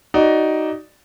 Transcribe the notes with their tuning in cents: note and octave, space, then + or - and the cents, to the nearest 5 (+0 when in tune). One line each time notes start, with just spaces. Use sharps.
D#4 +5 F#4 +25 D5 +0